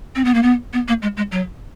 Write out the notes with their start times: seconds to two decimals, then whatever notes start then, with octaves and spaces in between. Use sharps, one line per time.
0.15 C4
0.25 B3
0.34 A#3
0.43 B3
0.73 B3
0.88 A#3
1.02 G#3
1.17 G#3
1.32 F#3